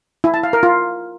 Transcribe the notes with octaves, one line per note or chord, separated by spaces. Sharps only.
E4
A5
F5
A#4
F4